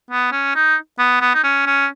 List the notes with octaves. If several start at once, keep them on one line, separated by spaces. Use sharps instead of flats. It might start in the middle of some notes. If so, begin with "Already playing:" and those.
B3
C#4
D#4
B3
B3
D#4
C#4
C#4